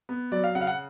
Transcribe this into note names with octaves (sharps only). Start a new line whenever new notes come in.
B3
F#3 D5
F5
C#3 F#5
F5
F#5